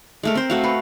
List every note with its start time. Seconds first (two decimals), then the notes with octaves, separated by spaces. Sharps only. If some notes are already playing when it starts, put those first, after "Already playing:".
0.23 G#3 A3 A#4
0.35 C4 C5
0.50 A3 F#4 F5
0.64 B4